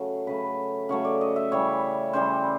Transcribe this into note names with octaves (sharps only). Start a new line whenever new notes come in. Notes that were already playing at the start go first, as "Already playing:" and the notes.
Already playing: C#3 F#3 A3
C#3 F#3 A3 B4
C#3 F#3 A3 C#5
D5
D#5
E5
C#3 E3 G3 C#5
C#3 E3 G3 C5